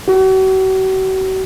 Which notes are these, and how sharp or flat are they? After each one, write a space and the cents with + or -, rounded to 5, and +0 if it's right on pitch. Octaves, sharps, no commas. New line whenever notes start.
F#4 +40